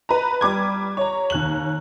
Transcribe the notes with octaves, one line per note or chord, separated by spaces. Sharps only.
B4 A#5
G3 D6 G#6
C#5 A#5
D#2 F#6 F#7